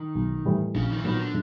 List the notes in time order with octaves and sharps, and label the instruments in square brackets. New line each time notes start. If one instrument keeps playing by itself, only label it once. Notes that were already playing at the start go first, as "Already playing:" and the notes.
Already playing: [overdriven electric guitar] D#3
[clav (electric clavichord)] B1
A2 E3 G3
[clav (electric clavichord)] A#1 [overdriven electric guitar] C#3
[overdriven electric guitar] D#3
E3
[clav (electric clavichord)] A#2 F#3 B3 [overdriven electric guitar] D#3
[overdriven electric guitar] D3